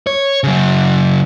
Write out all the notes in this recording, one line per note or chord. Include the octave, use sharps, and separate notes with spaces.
C#5
C#3 F#3